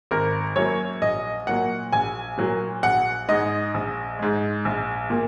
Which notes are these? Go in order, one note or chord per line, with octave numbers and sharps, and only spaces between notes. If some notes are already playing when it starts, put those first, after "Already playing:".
G#1 A#4
F#2 F#3 A#3 C#5
A#1 D#5
A#2 F#3 A#3 F#5
A#1 G#5
A#2 F#3 A#3
A#1 F#5
G#2 G#3 D#5
A#1
G#2 G#3
A#1
A#2 A#3